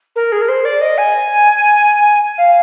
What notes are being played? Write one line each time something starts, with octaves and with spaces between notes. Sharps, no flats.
A#4
G#4
A#4
C5
D5
D#5
G#5
F5